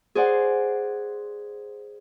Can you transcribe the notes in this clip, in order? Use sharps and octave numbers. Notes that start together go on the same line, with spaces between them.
G#4 C5 D5 F#5